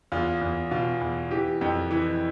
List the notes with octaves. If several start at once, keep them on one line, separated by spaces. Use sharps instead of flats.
E2 F4
E2
B2 F4
E2
E3 G4
F2
E3